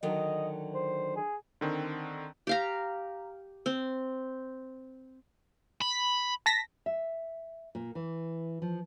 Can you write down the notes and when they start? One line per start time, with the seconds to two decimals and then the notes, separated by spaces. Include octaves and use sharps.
0.03 D3 D#3 F#3 D#5
0.74 C5
1.16 G#4
1.61 D3 D#3 C4
2.47 G4 F5 A#5
3.66 C4
5.82 B5
6.46 A5 A#6 B6
6.86 E5
7.75 A#2
7.95 E3
8.62 F3